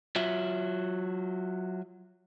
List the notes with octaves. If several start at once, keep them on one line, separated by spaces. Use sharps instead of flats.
F#3 F4 E5